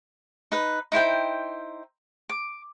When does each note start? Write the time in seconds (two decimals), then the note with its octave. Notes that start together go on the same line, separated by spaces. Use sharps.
0.52 D#4 B4
0.92 D#4 E4 C5 G5
2.29 D6